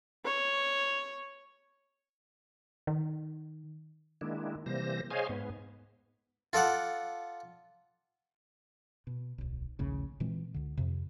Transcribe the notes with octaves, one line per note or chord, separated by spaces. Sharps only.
C#5
D#3
D#3 G#3 A#3 D4 E4
C3 E3 G3 A#3 C5 A#6
G#4 C5 C#5 D#5 F5 G#5
G#2 B3
F4 A4 D5 F#5
B2
D1 B1
A#1 D#2 A2 C#3
A#2 E3 G#3 C4
C#2 D3
F2 C3